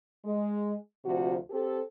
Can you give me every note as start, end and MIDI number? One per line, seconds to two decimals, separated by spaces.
0.25 0.74 56
1.05 1.37 38
1.05 1.37 48
1.05 1.37 53
1.05 1.37 66
1.50 1.80 60
1.50 1.80 67
1.50 1.80 69